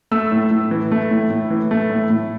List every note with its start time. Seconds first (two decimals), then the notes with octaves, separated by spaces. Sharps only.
0.11 A3 E6
0.32 A2
0.51 A2
0.71 E3
0.92 A3
1.11 A2
1.31 A2
1.50 E3
1.71 A3
1.90 A2
2.10 A2